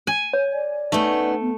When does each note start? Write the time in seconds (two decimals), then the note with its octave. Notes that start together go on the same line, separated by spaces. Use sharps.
0.07 G#5
0.33 C#5
0.53 D5
0.92 A3 B3 C#4 D#4
1.41 B3